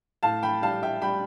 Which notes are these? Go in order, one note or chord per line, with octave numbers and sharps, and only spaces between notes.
A2 F5 A5
G5 B5
G3 F5 A5
E5 G5
G3 G5 B5